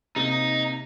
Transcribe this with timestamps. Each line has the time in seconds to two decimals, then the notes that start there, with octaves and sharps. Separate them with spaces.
0.16 C3 A#3 D#4